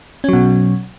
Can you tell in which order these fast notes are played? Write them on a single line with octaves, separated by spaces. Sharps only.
C#4 F#3 B2